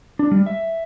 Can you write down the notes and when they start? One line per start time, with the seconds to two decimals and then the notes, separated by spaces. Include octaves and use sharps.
0.19 D4
0.31 G3
0.46 E5